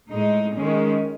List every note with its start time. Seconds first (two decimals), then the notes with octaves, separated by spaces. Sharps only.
0.11 A2 G#3 D#4
0.55 D#3 G#3 C#4